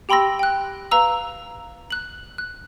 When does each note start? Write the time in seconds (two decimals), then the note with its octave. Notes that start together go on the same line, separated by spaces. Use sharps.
0.09 G4 G5 B5 C6 E6 A#6
0.39 G5 F#6
0.91 B4 F5 A#5 E6
1.90 F#6 F#7
2.38 F#6